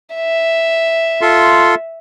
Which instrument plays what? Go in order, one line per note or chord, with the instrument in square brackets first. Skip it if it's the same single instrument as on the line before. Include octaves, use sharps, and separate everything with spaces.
[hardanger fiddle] E5
[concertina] F4 A4 C6